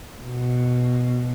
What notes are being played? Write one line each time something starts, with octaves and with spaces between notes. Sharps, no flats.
B2